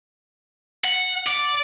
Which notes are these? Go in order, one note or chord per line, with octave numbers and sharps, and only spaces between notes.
F#5
D5